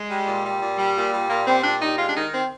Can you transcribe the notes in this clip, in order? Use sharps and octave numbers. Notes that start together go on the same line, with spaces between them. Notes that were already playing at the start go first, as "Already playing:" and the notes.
Already playing: G#3
G3
A#2
G3
A#2
G3
A#2
G3
A#2 A#3
G3 C4
A#2 D4
G3 D#4
G#3 F4
D4
D#3 D#4
C4